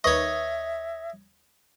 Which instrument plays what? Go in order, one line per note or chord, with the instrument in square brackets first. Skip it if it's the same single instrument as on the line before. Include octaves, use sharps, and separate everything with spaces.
[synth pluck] D#2 B4 C#6 [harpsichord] C#5 D#5 [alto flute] E5